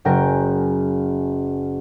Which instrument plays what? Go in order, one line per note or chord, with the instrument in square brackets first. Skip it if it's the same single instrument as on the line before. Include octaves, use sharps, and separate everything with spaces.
[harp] F#1 C#4 F#4 A#4 G5 A#6